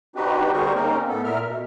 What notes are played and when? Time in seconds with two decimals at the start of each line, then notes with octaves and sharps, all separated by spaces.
0.16 C4 D4 D#4 F#4 G4 B4
0.53 D3 G3 G#4 A#4 C5 C#6
0.75 A#3 C4 C#4 D#4 A#4
1.08 A2 B3 A4
1.24 A#2 A#4 E5 F6
1.46 B2